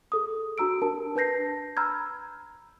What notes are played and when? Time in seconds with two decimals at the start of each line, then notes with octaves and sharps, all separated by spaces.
0.12 G#4 A4 D#6
0.58 D4 F#4 A#5 E6 D7
0.81 D4 G4 A#4 A5
1.15 D4 B4 A5 G6 A#6 C7
1.77 A#5 B5 E6 F6 G6 G#6